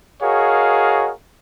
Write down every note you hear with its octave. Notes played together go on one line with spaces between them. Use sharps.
F#4 G#4 A#4 C#5 D#5 F5